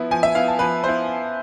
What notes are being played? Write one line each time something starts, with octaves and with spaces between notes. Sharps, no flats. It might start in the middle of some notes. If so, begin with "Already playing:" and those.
Already playing: F3 B3 E4
F3 G#5
E5
B3 E4 F5
A5
F3 B4
B3 E4 C5